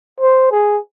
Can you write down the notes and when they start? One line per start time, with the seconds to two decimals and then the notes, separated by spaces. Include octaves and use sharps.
0.20 C5
0.51 G#4